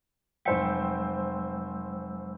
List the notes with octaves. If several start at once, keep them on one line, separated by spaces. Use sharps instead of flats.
F1 F#3 G#3 C5 G5 E6